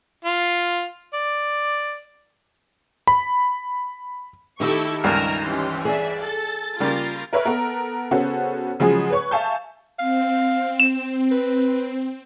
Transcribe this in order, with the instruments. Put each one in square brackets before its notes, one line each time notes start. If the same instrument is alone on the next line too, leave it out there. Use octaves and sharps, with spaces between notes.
[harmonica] F4
D5
[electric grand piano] B5
[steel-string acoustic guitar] D#3 D#4 E5 [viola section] E4 G4 A4 [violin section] C#6
[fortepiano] C#2 G2 G3 [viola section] A#4 G#5 A#5 [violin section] E6 F6
[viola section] E3 [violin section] C#4 G4 C6
[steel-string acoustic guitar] G#4 [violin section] D5 E5
[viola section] A4 [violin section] A6
[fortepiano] C#3 G3 A#3 [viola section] F4 A#4
[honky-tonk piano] A#4 B4 C#5 E5 B5
B3 A4 A#4
C#3 B3 C#4 F#4 A4 C5
C#3 F3 F#3 G#3 F#4 G#4
B4 C#5 C#6
E5 F5 G#5 A5 C#6 G6
[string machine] C4 [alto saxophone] F5
[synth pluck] E7
[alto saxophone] B4